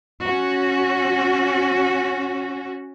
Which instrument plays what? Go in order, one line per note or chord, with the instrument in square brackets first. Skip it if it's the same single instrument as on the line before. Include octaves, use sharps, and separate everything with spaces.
[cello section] C#4 F#4